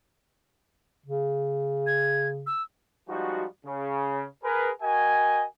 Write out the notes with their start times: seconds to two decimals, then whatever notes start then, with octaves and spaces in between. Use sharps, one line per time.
1.06 C#3
1.87 G#6
2.47 E6
3.09 F3 G3 G#3 D#4 F#4
3.65 C#3
4.43 G#4 A#4 B4
4.81 F#4 A#4 D#5 G5 G#5